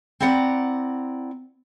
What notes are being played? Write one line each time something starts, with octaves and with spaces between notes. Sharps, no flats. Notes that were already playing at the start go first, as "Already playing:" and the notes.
C4 E4 D5 F#5 A#5